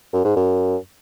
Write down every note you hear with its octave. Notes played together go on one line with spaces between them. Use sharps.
F#2
G#2
F#2